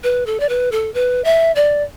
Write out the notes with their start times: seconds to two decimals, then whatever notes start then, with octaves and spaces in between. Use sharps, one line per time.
0.03 B4
0.26 A4
0.40 D5
0.49 B4
0.72 A4
0.94 B4
1.24 E5
1.55 D5